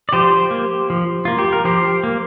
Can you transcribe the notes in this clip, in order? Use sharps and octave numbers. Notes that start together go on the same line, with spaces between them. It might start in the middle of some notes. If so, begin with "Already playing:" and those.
D5
F3 G4 C5
A#3
F3
A#3 F4
G4
A#4
F3 G4 C5
A#3